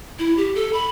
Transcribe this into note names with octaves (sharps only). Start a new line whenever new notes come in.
E4
G4
A4
B5